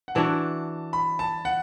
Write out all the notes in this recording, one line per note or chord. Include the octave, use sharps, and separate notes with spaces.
F#5
E3 D4 F#4 A5
B5
A5
F#5